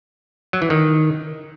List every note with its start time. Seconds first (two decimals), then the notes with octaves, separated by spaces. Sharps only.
0.53 F#3
0.62 E3
0.70 D#3